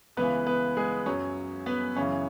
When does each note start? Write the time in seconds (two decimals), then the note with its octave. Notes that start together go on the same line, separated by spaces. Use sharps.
0.17 C#2 C#3 E3 B3 B4
0.46 B3 B4
0.77 G#3 G#4
1.06 F#2 F#3 C#4
1.66 B3 B4
1.96 F#2 C#3 E3 C#4